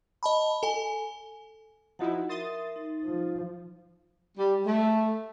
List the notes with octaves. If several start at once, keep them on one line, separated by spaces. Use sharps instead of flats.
D#5 A5 B5
A4 G#5
F3 D#4 E4 F#4 F#5
A#4 E5 C6 D#6 A6
D#4
F3
G3
A3